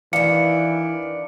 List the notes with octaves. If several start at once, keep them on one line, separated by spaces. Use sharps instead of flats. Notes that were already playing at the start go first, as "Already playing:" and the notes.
D#3 E3 D4 F5 C#7